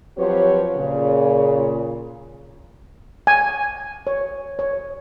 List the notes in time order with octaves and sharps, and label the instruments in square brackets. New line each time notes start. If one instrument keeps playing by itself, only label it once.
[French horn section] F3 F#3 C4 G4 B4 C#5
A#2 C#3
[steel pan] G#5
C#5
C#5